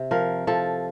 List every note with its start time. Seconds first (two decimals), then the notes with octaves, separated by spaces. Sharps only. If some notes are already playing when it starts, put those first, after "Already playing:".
Already playing: C3
0.11 F3 A#4
0.47 F3 A4